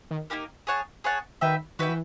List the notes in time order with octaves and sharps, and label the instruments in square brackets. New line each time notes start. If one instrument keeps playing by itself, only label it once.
[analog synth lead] D#3
[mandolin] A#3 D#4 G4 A#4
G#4 C#5 F#5 A5
G#4 C#5 F#5 A5
[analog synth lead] D#3 [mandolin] F#4 B4 E5 G5
[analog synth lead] D#3 [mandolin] F#4 B4 E5 G5
[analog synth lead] E3